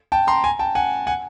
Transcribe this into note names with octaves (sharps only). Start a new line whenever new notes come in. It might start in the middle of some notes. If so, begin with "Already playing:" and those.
G5 A5
A#5 C6
G#5 A#5
G5 A5
F#5 G#5
F#5 G#5